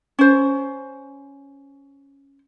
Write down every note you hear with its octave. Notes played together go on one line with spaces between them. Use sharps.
C#4 C5